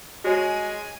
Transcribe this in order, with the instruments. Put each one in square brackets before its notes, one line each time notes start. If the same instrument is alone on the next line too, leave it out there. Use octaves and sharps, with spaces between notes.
[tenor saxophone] G#3 [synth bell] F#4 C#5 [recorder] G#5